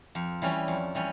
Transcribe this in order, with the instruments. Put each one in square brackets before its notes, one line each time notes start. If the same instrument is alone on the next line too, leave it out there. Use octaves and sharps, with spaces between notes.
[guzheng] F2
E3 G3 C#4
F2
E3 G3 C#4